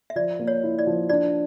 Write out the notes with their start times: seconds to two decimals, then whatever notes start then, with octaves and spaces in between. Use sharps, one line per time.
0.10 E5
0.16 F3 D5
0.39 A#3
0.47 C#5
0.63 E4
0.79 D5
0.87 F3
1.10 D4 D5